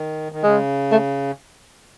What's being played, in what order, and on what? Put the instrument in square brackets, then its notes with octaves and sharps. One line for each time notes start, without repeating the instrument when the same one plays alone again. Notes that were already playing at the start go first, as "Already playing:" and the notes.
Already playing: [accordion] D#3
D#3
[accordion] C#3 [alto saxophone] G#3
[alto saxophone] A3